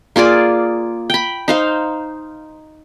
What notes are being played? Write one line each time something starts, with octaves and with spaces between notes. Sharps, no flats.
A#3 F4 G#4 D5
G5 B5
D#4 C5 F5